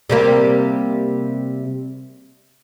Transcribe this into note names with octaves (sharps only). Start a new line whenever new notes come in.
C3 G3 A#3